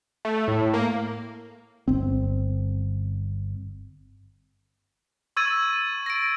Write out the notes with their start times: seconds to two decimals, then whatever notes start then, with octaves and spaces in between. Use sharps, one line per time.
0.25 A3
0.48 A2
0.74 A#3
1.88 G1 C4
5.37 C#6 E6 G#6 A6 D#7
6.06 A#6 D7